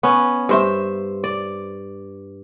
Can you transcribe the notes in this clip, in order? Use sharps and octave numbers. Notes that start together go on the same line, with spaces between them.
B3 C#4
G2 C5 E5
D5